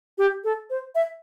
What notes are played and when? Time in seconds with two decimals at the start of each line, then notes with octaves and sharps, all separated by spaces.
0.18 G4
0.44 A4
0.70 C5
0.95 E5